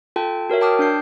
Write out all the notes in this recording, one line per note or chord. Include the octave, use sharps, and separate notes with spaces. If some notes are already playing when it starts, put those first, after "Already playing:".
F4 A4 G5 A5
F#4 A#4 C#5 E5
G5 A5 D6 D#6 F6
D4 G6 C7